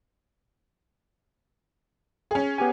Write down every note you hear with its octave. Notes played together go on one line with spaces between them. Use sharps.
C#4 G#4
B3 G4 G#5